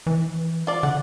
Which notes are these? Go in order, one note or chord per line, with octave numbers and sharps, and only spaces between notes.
E3
F4 D5
D3 F#5